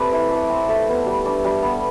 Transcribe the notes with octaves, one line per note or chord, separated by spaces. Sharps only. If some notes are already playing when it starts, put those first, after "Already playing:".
Already playing: A3 C4 G4 A4 B4 D5
E4
A3
C4
A3
B3
G3
D4
G3
B3